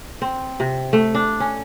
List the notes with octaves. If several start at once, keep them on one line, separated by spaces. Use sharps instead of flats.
C4
C3
A3
D4
C#4